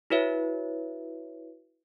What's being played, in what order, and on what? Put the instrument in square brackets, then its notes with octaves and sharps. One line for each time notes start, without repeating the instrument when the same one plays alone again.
[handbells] E4 F#4 B4 C#5 E5